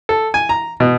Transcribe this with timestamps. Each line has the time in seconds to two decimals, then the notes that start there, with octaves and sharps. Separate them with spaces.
0.09 A4
0.34 G#5
0.49 A#5
0.80 B2